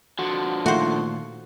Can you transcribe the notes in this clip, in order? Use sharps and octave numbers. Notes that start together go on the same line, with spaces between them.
D3 F3 F#4
A#2 D#3 A3 F4 F#4 C5